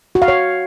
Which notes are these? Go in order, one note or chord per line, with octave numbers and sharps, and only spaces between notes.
F#4
F5
C#5